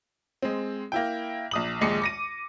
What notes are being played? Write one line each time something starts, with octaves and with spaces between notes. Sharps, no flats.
G#3 C4
A#3 E4 G5
A#1 D#6 F#7
A#1 D#2 G#3 D6 C#7
D6 A#6 D#7